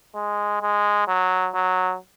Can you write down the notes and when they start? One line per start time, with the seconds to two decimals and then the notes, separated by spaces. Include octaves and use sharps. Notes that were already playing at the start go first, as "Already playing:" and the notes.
0.15 G#3
0.62 G#3
1.08 F#3
1.54 F#3